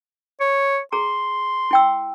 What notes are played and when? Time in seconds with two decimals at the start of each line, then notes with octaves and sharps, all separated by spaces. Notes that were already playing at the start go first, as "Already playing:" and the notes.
0.40 C#5
0.92 G#4 A#5 C6
1.71 E4 G5 E6